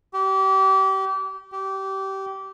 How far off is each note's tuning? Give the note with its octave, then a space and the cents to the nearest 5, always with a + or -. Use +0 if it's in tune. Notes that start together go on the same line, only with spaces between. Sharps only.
G4 -30
G4 -20